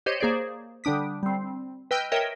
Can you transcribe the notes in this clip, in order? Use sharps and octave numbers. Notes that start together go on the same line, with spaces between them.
G4 C5 C#5 D#5
A#3 G#4 C5 D5
D3 G3 D4 D#6 B6
G3 C4
B4 D#5 G5 E6 F6 G6
A#4 C#5 D#5 E5 G5